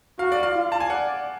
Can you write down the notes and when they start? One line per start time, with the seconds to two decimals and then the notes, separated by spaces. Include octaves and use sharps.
0.19 F#4 F5
0.32 D5
0.43 F5
0.55 F4
0.72 A5
0.80 G#5
0.89 D5 F#5